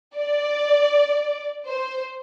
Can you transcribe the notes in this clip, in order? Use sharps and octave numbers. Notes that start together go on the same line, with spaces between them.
D5
C5